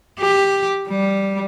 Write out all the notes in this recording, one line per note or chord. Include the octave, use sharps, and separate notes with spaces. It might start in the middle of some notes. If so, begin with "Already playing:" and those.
G4
G3